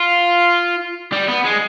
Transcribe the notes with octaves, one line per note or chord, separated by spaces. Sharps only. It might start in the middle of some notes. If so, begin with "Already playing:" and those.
Already playing: F4
G3
B3
G#3